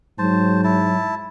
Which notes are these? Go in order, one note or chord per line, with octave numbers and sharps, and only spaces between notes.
G#2 F#3 C5 A5
E4 A5